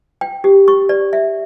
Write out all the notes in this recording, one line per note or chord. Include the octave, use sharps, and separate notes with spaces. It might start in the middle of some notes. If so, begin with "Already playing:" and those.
G5
G4
C#6
D5
E5